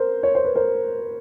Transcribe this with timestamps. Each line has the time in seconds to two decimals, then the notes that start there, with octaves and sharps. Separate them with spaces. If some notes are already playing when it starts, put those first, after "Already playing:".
Already playing: A#4 C5
0.23 C#5
0.35 C5
0.45 B4
0.55 A#4 C5